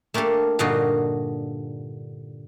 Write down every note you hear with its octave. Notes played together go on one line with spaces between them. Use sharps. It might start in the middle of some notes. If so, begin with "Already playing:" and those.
A3 A#3 D4 G4 A4
G2 A#2 D3 D#4 F4 F#4